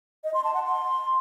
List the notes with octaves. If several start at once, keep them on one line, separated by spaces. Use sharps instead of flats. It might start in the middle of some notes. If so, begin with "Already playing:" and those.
D#5
C6
A5
F#5
C6